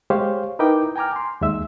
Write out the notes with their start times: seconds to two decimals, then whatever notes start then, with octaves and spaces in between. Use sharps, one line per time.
0.10 G#3 G4 C5 C#5 F5
0.59 D#4 E4 A#4 B4 G5 D6
0.96 G5 G#5 A#5 D6 F6
1.16 C6
1.41 D#2 G#3 E5 E6